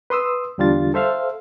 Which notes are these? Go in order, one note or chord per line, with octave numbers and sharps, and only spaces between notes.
B4 C6 D#6 E6
E2 D3 G3 D4 F4 A6
A4 C5 E5 F5